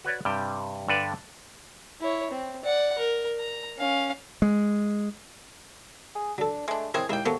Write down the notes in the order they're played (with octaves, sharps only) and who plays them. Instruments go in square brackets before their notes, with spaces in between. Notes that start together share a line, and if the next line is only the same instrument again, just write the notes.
[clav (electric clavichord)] F#4 B4 C#5 D5
G2 C3 G3 G5
G2 D3 D4 A4 B4 D5
[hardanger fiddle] E4 C#5
C4
D5 F#5
A#4
A#5
C#4 F5
[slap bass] G#3
[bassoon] G#4
[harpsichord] F#3 A4 [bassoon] D4
[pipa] G#3 D4 [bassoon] A3
[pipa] G#3 G#4 [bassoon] C4 [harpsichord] E4 A#4 C#5
[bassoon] D#2 [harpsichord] G#3 E4 [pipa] A#3 G5
[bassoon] C3 [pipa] F#3 [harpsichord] A#3 B3 A4